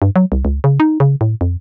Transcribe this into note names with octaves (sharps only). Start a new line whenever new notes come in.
G2
F#3
C2
C#2
C#3
D#4
C#3
A2
F2